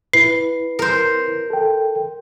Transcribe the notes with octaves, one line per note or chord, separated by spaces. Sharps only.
E4 B4 C7
A#4 C5
A4 G5